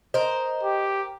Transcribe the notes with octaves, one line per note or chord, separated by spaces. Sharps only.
A#4 C5 D#5
G4